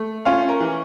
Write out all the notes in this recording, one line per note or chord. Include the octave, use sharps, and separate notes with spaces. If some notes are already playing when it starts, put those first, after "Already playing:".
Already playing: A3
C#4 F4 F5
A#4
E3